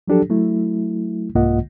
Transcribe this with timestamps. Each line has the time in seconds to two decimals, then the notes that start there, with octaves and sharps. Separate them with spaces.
0.08 F3 F#3 D4 G4 A4
0.29 F#3 A3 E4
1.35 C2 G#2 A#3 F4 D#5 F#5